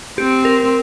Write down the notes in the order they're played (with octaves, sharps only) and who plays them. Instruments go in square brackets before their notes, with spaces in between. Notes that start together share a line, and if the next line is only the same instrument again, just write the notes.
[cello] C4 [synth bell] G4
[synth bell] A#4